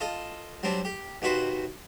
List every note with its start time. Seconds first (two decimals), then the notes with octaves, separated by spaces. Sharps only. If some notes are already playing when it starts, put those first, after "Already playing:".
0.01 F4 A4 D#5
0.63 F#3 G3 C4 D4
0.85 G4
1.22 D#2 B2 F#4 B4 C5